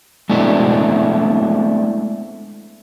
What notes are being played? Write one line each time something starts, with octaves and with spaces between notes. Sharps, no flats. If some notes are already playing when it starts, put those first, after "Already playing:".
G#3 A3 B3 C4 D4 E4